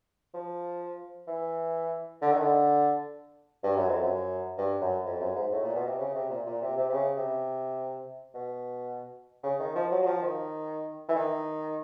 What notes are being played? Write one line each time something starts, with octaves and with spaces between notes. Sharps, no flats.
F3
E3
D3
D#3
D3
G2
F#2
F2
F#2
G2
F#2
F2
F#2
G#2
A2
A#2
B2
C3
C#3
C3
A#2
A#2
C3
C3
C3
C#3
C3
B2
C#3
D#3
F3
F#3
F#3
F3
D#3
E3
D#3